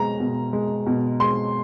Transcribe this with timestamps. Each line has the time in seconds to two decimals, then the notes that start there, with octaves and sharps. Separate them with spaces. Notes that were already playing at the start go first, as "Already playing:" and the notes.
Already playing: B2 G#3 A#5
0.20 B2
0.53 G#3
0.86 B2
1.20 G#3 C6